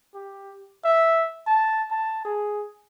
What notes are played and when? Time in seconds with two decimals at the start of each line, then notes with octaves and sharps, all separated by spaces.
0.14 G4
0.84 E5
1.47 A5
1.91 A5
2.25 G#4